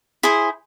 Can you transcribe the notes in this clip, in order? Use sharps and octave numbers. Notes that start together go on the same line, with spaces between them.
E4 G#4 C5